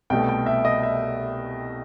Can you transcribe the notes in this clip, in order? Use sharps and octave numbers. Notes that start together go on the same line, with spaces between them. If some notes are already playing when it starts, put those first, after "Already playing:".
C2 B2 A3 G5
G5
E5
D#5
E5